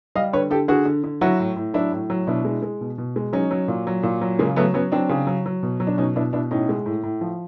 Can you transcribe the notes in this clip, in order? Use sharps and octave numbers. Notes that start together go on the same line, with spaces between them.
G3 D#5 F5
D3 B4 C#5
D3 G4 A4
D3 F#4 G#4
D3
D3
F#3 E4 F#4
A2
A2
F#3 D4 E4
A2
F#3
B2 D4 E4
G#3
G#3
B2
B2
G#3
F#3 C#4 D#4
F#3
A#2
F#3
A#2
F#3
C#3 G#3 A#3
F#3 A3 B3
F#3 B3 C#4
F#3 C4 D4
C#3
F#3
F#3
B2
F#3
D4
B2 C#4 D#4
B2 D4 E4
B2 D4 E4
A2 C#4 D#4
G#3
A2
A2
F3